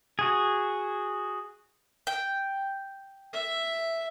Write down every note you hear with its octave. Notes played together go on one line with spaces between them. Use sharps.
F#4 G#4
G5
E5